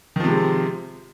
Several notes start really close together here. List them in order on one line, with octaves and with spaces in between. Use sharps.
D#3 F3 C3 G#3